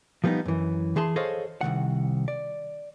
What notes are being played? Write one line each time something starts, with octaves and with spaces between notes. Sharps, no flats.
F3 G3 B3 C4 D#4
F#2 E3
E3 G#4 A5 C6
G#4 A4 C5 C#5 D#5 F5
C2 C3 D#3 F#5
D5